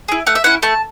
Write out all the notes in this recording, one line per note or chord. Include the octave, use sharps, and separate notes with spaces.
E4 G#4
A3 F#5
E5
C#4 E4 F#5
A3 A5